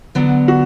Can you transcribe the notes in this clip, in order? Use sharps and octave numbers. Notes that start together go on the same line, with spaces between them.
D3 F#3 B3
F#4